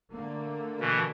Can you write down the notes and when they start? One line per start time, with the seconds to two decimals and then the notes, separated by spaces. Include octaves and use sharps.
0.12 D3 A3 A#3
0.80 B2 E3